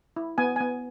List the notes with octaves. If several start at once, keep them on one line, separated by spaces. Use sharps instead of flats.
E4
B3 G#5
B3 G#5